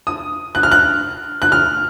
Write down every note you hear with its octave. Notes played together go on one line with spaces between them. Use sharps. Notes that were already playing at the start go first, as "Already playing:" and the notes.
D#6
F#6
F6
F#6
F#6
F6